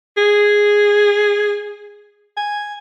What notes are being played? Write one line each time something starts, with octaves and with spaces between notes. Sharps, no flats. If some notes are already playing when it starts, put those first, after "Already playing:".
G#4
G#5